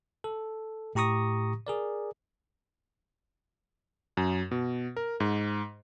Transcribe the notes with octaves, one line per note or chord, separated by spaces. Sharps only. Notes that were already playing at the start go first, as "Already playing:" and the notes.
A4
A2 G4 A#5 C#6 D#6 A#6
G#4 A#4 D5
F#2
B2
A#4
G#2